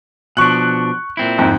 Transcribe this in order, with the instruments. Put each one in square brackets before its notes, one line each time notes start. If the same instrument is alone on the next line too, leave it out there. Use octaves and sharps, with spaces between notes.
[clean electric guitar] B2 F3 D4 [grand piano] C#6 F#6
[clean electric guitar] A#2 C4 E4
[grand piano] F2 G#2